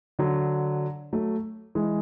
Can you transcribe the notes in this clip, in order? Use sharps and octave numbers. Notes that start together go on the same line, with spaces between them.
D3 F#3
F#3 A3
E3 G#3